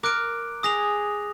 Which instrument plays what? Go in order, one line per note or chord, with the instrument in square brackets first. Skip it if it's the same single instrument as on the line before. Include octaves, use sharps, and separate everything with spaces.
[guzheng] A#4 [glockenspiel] D6 F#6 D7
[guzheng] G#4 [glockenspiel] D#6 A#6 F7